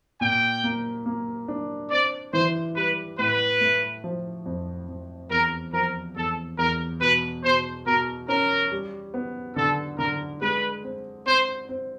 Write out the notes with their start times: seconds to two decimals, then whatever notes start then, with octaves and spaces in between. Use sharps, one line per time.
0.21 A#2 G5
0.64 A#3
1.06 A#3
1.48 D4
1.91 C4 D5
2.33 E3 C5
2.76 G3 B4
3.18 A2 B4
3.61 A3
4.04 F3
4.46 F2
4.88 F2
5.30 E2 A#4
5.73 F3 A#4
6.16 E2 A4
6.58 E2 A#4
7.01 B2 B4
7.44 B2 C5
7.86 B2 A#4
8.29 C#4 A#4
8.71 G3
9.14 B3
9.56 D3 A4
9.99 D3 A#4
10.41 G#3 B4
10.84 C4
11.26 C4 C5
11.69 C4